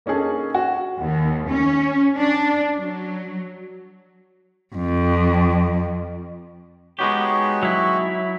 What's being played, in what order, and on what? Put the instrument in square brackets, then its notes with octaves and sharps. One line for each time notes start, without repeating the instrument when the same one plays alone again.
[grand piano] A#3 C#4 D#4 G#4 A4
F#4
[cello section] D#2
C#4
D4
F#3
[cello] F2
[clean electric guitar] G#3 B3 G4 [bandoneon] D#4 F#4 C#5
[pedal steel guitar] F#3 E4